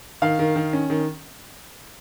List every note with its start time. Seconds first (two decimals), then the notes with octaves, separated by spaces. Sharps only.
0.22 D#3 F5
0.39 D#3
0.56 D#3
0.73 C#4
0.90 D#3